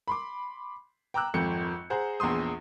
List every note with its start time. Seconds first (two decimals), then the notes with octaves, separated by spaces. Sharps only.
0.08 B5 C6 D6
1.14 G5 A#5 D6 E6 F#6
1.34 G#1 F2 F3 G6 C#7
1.90 G#4 C5 F#5 A#5
2.20 A#1 E2 G#4 C6 D#6